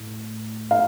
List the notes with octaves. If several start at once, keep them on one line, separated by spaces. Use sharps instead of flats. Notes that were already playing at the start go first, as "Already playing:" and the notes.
Already playing: A2
F5